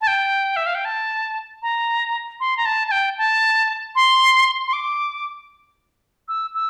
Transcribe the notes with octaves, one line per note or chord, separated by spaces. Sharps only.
A5
G5
E5
F5
G5
A5
A#5
C6
A#5
A5
A5
G5
A5
C6
C6
D6
E6
E6